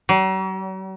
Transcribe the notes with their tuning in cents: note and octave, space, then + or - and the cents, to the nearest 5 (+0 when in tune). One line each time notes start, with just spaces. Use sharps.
F#3 +45